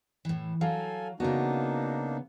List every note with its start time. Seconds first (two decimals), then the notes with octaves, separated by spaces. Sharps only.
0.25 A2 E3
0.61 F#3 A4 F5 G#5
1.20 C#3 A#3 B3 D4 D#4 F#4